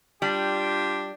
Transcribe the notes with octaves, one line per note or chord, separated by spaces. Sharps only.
G3 D4 F4 G4